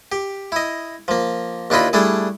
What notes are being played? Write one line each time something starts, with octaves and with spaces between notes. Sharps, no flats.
G4
E4 D#5
F3 A#3
D#2 D4 E4 F4 D#5 B5
G3 A3 D4 E4 G#4